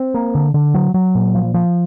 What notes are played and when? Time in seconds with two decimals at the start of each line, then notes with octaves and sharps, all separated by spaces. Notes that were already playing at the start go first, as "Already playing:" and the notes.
Already playing: C4
0.14 A#3
0.35 D3
0.54 D3
0.74 F#3
0.94 F#3
1.15 A#2
1.35 F3
1.54 F3